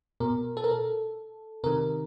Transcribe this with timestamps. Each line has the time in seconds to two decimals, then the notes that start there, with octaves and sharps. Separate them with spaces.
0.20 B2 A#4
0.57 A4
0.64 A#4
0.71 A4
1.64 C3 D#3 A#4